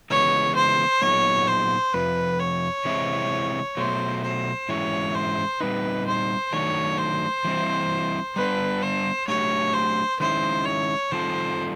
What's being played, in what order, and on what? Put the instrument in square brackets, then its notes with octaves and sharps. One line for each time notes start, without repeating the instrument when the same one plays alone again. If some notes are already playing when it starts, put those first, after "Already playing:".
[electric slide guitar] C#3 E3 G#3 B3 [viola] C#5
[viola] C5
[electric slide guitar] A#2 F#3 B3 D#4 G#4 [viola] C#5
[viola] C5
[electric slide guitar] F2 C3 F3 [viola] B4
[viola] C#5
[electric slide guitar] C3 E3 G#3 C4 E4
[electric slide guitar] B2 F#3 A3 [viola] C5
[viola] C5
[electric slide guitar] G#2 E3 G#3 C#4 E4 [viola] C#5
[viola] C5
[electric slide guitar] A#2 G3 C4 D#4 [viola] B4
[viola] C5
[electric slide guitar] D#3 F#3 A3 D4 [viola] C#5
[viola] C5
[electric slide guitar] E3 G3 C4 E4
[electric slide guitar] G3 B3 D4 [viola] B4
[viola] C5
[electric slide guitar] F#3 A3 D4 G4 [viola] C#5
[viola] C5
[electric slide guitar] D#3 G#3 C#4 E4 [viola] C5
[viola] C#5
[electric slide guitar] D#3 G3 C4 F4 A4 [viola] C5